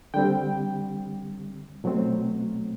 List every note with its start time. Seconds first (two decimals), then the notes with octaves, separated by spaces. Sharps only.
0.14 D3 G3 C4 G5
1.84 B2 F#3 A3 C4